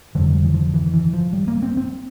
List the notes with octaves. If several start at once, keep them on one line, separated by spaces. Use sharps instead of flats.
F1 F2 D3 G3
G3
E3
F3
E3
E3
F3
G3
A#3
C4
C4